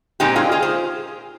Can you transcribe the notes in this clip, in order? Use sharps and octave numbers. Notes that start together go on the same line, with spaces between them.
A#2 G#3 C4 D#4 G4
F4 G#4
F4 G#4
G#4 C5